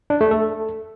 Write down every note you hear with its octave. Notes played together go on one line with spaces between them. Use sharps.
D4
A3
A4